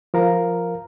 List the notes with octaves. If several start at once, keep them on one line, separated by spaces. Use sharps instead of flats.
F3 A#4 F5 A#5